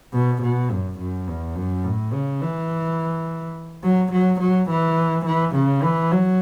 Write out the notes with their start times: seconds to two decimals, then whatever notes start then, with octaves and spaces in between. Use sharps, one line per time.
0.13 B2
0.42 B2
0.70 F#2
0.99 F#2
1.28 E2
1.56 F#2
1.84 A2
2.13 C#3
2.42 E3
3.84 F#3
4.12 F#3
4.40 F#3
4.70 E3
5.26 E3
5.55 C#3
5.82 E3
6.11 F#3